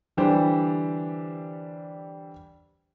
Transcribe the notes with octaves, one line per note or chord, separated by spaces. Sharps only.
D3 E3 G3 D4 G4 C5